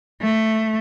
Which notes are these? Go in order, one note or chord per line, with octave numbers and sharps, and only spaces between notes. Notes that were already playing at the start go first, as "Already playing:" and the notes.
A3